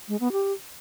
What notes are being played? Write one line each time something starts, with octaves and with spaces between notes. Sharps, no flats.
G#3
B3
G4